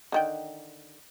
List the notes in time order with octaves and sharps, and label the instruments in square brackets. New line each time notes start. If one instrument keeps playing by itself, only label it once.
[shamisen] D3 D#3 G5